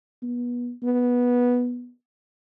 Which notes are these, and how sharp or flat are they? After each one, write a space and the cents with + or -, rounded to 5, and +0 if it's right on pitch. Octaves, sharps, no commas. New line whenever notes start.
B3 -25
B3 -10